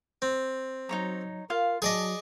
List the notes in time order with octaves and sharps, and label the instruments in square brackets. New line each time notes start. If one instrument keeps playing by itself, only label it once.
[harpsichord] C4
[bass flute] F#3 [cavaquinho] D#4 C#5 A#5
[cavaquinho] F4 F5 [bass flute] A#4
[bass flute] F#3 [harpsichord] G#4 D5 D#5 [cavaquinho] A5